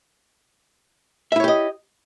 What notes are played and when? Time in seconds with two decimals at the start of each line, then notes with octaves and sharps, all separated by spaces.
1.32 E5
1.36 E4
1.40 C#5
1.44 G4
1.48 D#5